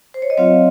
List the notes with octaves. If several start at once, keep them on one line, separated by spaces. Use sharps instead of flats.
C5
C#5
D#5
F#3 C4 F4 C#5 F5